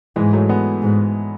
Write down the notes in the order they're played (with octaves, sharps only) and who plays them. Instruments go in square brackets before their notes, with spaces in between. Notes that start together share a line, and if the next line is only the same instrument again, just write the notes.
[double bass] G#2 [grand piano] E3 G#3
[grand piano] F#3 A3
G#3 B3
[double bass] G#2